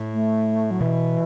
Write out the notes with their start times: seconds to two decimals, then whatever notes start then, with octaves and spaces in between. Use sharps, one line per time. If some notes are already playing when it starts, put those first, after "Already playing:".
Already playing: A2
0.14 A3
0.71 F#3
0.81 B2 E3